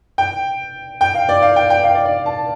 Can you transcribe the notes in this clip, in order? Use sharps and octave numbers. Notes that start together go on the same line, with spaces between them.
G5
G5
F5
D5
F5
G5
G5
F5
D5
D5
A5